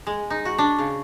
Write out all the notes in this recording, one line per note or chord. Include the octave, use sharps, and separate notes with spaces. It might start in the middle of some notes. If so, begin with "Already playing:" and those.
G#3
D#4
F#4
D4
C#3